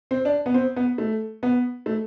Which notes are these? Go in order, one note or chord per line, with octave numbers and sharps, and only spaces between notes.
C4
D4
B3
C4
B3
A3
B3
A3